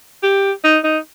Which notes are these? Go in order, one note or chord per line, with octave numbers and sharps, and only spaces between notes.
G4
D#4
D#4